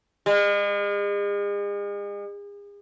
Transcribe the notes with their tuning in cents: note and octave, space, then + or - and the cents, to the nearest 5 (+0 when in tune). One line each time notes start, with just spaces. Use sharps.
G#3 -40